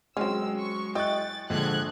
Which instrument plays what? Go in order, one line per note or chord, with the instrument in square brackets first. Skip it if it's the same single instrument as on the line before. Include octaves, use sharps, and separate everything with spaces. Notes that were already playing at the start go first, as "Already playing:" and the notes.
[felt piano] F#3 G#3 [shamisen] C4 C#4 [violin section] E6
[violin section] C#6
[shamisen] E4 D#5 [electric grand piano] G5 C#6 F#6 [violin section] A6
[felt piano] A#1 [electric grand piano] D3 F3 G#3 [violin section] F#6 G#6